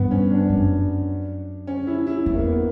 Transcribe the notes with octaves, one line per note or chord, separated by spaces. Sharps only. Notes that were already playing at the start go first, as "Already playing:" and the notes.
Already playing: G2 B3
C#4
D4
C#4
F#2 D4
C#4
E4
E4
E2
A#3
B3